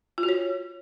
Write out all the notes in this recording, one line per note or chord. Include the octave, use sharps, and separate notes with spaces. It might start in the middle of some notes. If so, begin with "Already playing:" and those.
F4
F#4
C#5